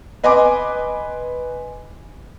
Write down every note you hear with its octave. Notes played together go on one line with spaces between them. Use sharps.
B4 D#5 G#5 B5 C6 D6